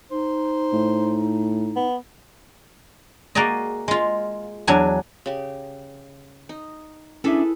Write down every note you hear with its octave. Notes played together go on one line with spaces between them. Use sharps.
D#4 C5
A2
B3
A#3 F#4 G#4 D5 D#5
G#3 F4
E2 F#3 D4 G#5
C#3 G4
D#4
C#4 D4 E4 G#4 A4 B4 E5